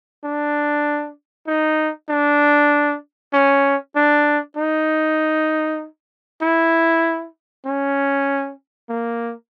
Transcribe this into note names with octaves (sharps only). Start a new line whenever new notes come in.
D4
D#4
D4
C#4
D4
D#4
E4
C#4
A#3